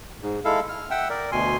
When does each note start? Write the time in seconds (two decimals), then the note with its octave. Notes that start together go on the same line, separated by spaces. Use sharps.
0.23 G#2
0.45 G#3 E4 A4 F5
0.69 F6
0.91 E5 F#5 G5 E6
1.10 A#4 D5
1.32 D2 B2 G#5 C6